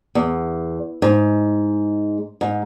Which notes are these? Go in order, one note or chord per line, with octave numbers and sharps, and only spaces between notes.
E2
G#2
G#2